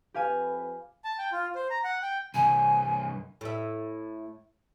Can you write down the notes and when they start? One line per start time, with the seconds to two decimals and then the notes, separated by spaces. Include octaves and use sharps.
0.14 F2 G4 B4 F5 G#5
1.04 A5
1.18 G5
1.32 F4
1.55 C5
1.70 A#5
1.84 F#5
2.02 G5
2.34 C2 G2 G#5
3.41 A2 E5